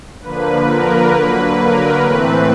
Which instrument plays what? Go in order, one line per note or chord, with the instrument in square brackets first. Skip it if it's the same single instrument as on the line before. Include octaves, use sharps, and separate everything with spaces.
[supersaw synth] D3 F3 A#3 B4
A#4
D3 F#3 A#3 B4
A#4
A2 E3 A3 C4 B4